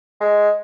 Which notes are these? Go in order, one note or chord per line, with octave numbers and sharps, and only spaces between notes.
G#3